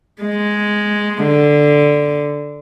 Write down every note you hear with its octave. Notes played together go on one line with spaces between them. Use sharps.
G#3
D3